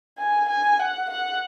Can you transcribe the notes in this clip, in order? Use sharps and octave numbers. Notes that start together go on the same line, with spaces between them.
G#5
G#5
F#5
F#5